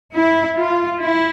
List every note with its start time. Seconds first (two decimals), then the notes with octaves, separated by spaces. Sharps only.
0.15 E4
0.58 F4
1.02 E4